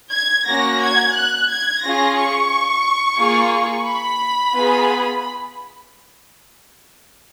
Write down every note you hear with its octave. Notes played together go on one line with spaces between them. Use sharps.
G#6
A#3 C#4 F#4 A#6
G#6
F#6
G#6
C#4 F4 G#4 A#6
C#6
A#3 F4 G#4
B5
B3 F4 G#4